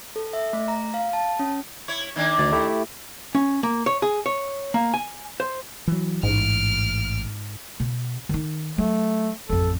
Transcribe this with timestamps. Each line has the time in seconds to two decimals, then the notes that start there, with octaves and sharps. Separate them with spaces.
0.16 A4
0.33 E5
0.53 A3
0.68 A#5
0.94 F5
1.13 A5
1.39 C#4
1.88 E4 C#5
2.16 D#3 A#3 D4
2.39 D2 D5
2.52 A3 E4 G4
3.35 C#4
3.63 A#3
3.86 C#5
4.02 G#4
4.26 C#5
4.74 A#3
4.94 G#5
5.40 C5
5.88 E3 F#3
6.23 A1 G#2 F6 D7
7.80 B2
8.29 D#3 D#4
8.78 F#3 A3
9.49 A1 F2 A4